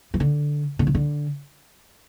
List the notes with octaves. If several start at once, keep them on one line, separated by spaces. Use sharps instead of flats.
E3
D3
D3
C#3
D3